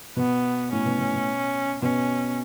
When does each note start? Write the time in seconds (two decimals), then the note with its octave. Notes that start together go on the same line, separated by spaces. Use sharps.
0.16 B2 B3
0.71 A2 C#4
0.85 B2
0.99 B2
1.13 B2
1.82 B2 C#4